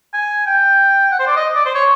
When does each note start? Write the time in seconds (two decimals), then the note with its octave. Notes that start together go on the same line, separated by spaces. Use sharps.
0.14 G#5
0.46 G5
1.11 F#5
1.19 C5
1.27 D5
1.36 D#5
1.55 D5
1.66 C5
1.75 C#5